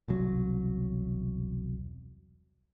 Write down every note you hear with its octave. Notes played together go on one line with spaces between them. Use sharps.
E1 C2 F#3